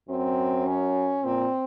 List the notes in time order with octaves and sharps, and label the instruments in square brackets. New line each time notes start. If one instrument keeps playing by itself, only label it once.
[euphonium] F#2 [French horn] C4
[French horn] C#4
[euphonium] A#2 [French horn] C4